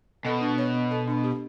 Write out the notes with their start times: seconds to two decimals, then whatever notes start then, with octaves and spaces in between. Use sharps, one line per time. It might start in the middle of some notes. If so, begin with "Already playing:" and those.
0.25 B2 A4
0.41 D4
0.58 C#5
0.74 B3
0.91 A4
1.08 D4
1.24 G4